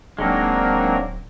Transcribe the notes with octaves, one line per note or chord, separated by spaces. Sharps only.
D1 F#3 G#3 A#3 C4 D4 D#4 A#4